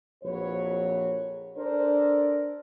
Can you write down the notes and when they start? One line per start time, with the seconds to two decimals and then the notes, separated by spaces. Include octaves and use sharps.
0.24 A#1 F2 F#3 B4 C#5
1.57 D4 A4 A#4 C5 D5